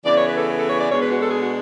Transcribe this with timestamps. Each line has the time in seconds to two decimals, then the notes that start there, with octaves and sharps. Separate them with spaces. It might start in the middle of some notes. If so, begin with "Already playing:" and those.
0.04 C#3 E3 B3 D5
0.16 C#5
0.25 B4
0.36 A4
0.58 A4
0.68 C#5
0.79 D5
0.90 B2 G#3 B3 D4 C#5
1.01 B4
1.11 F#4
1.21 A4
1.30 G#4
1.40 F#4